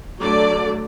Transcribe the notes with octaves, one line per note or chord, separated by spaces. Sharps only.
D3 F#3 A3 D5